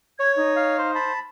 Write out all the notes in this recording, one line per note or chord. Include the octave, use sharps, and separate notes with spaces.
C#5 G#6
D#4
F5
C5
A5 B5